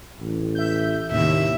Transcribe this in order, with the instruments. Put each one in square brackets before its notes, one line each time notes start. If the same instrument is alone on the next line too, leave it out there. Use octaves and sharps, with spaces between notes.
[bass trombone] A1
[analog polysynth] E5 G6
[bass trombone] D#2 [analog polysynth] A2 C3 [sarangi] E5